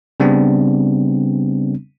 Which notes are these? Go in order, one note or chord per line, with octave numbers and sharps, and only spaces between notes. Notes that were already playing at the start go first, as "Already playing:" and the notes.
C#3 G3 B3 C4 D4